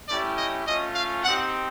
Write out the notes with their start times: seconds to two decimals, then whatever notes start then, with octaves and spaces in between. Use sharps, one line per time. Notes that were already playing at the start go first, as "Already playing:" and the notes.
0.09 A3 C#4 E4 G4 D5
0.38 D#5
0.67 A3 C#4 F4 D#5
0.95 F5
1.24 C4 D#4 G4 F#5